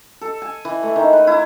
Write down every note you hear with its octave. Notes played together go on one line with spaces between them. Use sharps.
A4
G#5
E3
A3
D#3
B4
E4